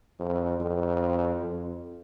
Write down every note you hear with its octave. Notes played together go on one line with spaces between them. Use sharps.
F2
F2
F2